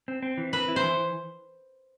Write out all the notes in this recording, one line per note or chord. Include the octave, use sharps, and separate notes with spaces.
C4
C4
E3
C4 B4
E4
C5
E3